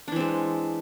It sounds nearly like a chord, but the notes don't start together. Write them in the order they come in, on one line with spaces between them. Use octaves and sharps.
D4 E3 C4 G#3